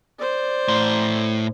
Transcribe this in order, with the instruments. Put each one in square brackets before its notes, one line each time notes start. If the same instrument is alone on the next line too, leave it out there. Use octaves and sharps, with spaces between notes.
[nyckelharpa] C5 D5
[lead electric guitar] A2 C6